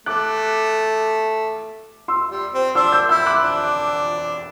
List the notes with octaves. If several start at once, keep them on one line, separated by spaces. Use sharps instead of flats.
A3 D6 F#6
C6 E6
G3
C4
D4 C6 E6
E6 G6
E4 E6 G6
D6 F#6
D4